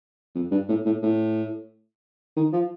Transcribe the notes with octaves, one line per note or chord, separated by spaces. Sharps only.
F2
G2
A2
A2
A2
D#3
F3